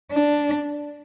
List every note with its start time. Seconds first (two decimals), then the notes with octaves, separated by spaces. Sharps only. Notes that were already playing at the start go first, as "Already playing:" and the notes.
0.12 D4